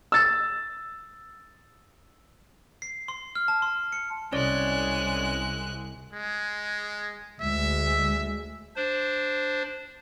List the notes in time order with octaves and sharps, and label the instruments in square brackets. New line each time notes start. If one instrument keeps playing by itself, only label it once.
[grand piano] E6 A6
[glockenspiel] C7
C6
F6
A5
C6
C#7
[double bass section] C2 [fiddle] G#3 F#6 [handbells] C#4 C#5 D5
[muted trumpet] G#3
[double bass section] D2 G#3 [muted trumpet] E5
[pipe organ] D4 C5